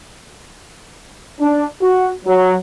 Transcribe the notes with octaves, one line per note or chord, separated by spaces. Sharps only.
D4
F#4
F#3